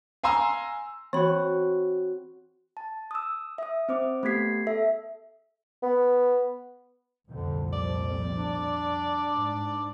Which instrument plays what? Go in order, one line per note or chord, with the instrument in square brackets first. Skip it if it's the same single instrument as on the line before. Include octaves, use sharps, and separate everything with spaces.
[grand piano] F5 G#5 A#5 C6 E6
[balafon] E3 [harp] C4 F#4 [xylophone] C#5 B5
[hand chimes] A5
D#6 E6
E5 D#6
C4 C5 D6
A3 B3 G4 G#6 B6 C7
A4 E5
[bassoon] B3
[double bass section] C2 F2 A#2 [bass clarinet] D3
[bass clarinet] F3 [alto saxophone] D5
[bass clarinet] D4
[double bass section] G#2